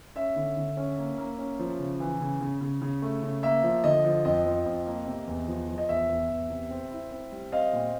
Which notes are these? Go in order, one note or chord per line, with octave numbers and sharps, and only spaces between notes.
C#4 E5
D3
D3
C#4
A#3
A#3
C#4
F3
C#3
E3
C#3
C#3
C#3
C#3
A3
C#3
A#3 E5
F3
D3 D#5
F3
F2 D#5
F3
F2
A#3
C3
E2
F3
F3
D#5
E2 E5
E2
E2
C3
C4
E4
C4
G3
C4 D#5 F5
A#2